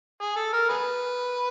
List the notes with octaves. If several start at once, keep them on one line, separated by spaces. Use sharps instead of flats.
G#4
A4
A#4
G#4 B4